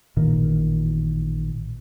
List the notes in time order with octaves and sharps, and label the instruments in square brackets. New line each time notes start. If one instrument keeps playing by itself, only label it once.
[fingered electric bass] A1 A#2 D#3